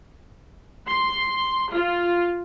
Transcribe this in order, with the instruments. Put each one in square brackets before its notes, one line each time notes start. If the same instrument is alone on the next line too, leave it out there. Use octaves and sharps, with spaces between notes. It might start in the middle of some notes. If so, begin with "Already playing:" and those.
[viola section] C6
F4